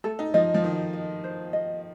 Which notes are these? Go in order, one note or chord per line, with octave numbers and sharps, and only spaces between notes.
A3 A4
D#4
F3 D#5
F3
D#3 D#4
D#5
C5
D#5